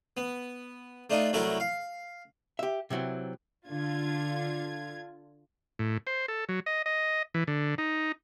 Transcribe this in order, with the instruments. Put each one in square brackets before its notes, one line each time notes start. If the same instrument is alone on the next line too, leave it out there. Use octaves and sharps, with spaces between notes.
[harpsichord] B3
A3 D4 D#4 F4
C2 F#3 A3 E4 F#4 A#4
F5
[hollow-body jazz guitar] G4 E5
C3 E3 F#3 C4
[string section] D3 F4 G#6
[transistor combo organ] A2
C5
A4
F#3
D#5
D#5
E3
D3
D#4